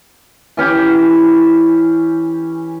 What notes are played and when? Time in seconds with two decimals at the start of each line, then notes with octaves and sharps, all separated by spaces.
0.57 E3 C#4 G4